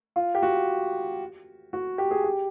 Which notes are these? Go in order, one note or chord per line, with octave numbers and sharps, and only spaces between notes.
F4
G4
F#4
F#4
G4
G#4
G4